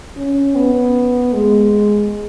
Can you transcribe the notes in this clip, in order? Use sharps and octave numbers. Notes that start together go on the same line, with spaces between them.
C#4
B3
G#3